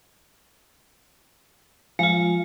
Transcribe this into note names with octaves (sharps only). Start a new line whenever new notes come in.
F3 G#3 F4 F5